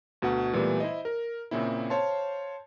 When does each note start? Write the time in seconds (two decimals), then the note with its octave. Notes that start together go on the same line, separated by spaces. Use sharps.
0.22 D2 B2 F#4 F#5
0.53 A#2 E3 G3 A3 B3
0.80 E4 C5 D#5
1.05 A#4
1.51 A#2 C#3 A#3 C4 E4
1.90 C5 C#5 F5 A5 C6